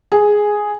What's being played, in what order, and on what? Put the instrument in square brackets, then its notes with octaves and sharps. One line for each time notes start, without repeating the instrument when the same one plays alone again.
[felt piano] G#4